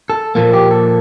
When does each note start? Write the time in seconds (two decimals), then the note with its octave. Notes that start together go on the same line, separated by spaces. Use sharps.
0.10 A4
0.35 A#2 F3 A#3 A4
0.53 G4
0.71 A4